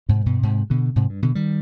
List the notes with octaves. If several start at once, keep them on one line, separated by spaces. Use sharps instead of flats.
G#2 C3
G2 B2
G#2 C3
B2 D3
G#2 C3
G2
B2 D3
D#3 G3